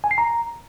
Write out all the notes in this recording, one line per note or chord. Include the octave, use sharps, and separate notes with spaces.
G#5
C7
A#5